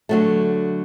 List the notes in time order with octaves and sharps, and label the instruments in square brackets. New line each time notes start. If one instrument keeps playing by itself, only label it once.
[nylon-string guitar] D3 F#3 A3